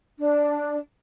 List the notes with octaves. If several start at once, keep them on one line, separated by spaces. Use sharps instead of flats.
D4